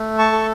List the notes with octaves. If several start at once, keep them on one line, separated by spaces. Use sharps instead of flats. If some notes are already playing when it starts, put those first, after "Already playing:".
Already playing: A3
A5 C#6
A4